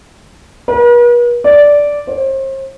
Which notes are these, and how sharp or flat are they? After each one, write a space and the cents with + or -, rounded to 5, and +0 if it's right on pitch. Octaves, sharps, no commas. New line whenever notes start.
B4 -45
D5 -5
C5 +40